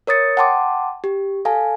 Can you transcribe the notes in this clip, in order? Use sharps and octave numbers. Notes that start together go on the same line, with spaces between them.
A#4 C#5 D#6 A6 C#7
F#5 G5 A5 C6 D6
G4
A4 F5 G#5 A5